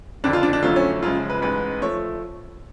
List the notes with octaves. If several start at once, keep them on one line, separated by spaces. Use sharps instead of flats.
F#1 F2 D3 D4
F4
D4
D4
F2 D3 F#3 A3 F4
C#4
F#2 C#3 F3 G#3 F4
B4
A1 G#2 G#3 B4
F3 A3 C#5